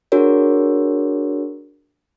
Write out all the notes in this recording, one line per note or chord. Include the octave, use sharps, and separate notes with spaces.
D4 F#4 G#4 A#4 C#5